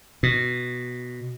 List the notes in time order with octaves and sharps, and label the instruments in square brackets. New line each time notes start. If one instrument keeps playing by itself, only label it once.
[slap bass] B2